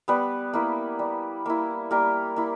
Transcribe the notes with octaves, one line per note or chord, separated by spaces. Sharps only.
G3 B3 B4
A#3 E4
G3
A#3 E4
G3 A#3 A#4
A#3 E4